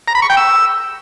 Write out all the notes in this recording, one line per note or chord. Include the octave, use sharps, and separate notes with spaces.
A#5
B5
C#6
G5
E6